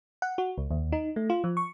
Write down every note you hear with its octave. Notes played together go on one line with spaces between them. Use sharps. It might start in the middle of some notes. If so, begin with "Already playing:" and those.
F#5
F#4
C#2
D#2
D#4
A3
F4
F3
C#6